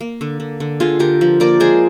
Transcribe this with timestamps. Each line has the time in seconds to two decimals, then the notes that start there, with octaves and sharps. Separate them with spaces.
0.01 A#3
0.21 D3
0.40 D3
0.60 D3
0.80 D3 F4 G#4
0.99 D3 G4 A#4
1.21 F3
1.40 A#3 A#4 D5
1.60 G#3 G#4 C5